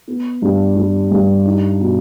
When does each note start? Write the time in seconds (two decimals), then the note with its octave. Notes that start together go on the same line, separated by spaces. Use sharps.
0.08 B3
0.42 G2
0.76 G3
1.11 G2
1.45 D#4
1.80 B2